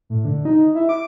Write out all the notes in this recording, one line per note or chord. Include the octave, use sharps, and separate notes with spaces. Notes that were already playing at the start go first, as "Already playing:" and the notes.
A2
D3
D#4
E4
D6